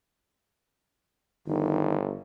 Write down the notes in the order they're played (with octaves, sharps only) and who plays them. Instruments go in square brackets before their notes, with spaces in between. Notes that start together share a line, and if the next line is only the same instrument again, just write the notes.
[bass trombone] G1 [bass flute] D#3